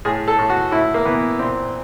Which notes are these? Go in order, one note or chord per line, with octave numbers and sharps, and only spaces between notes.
A2 G#4
A4
A2
F#4
A2 E4
A#3
E3 B3
A#2 C4